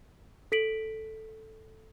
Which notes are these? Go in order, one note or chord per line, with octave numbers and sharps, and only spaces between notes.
A4 B6 D7 F#7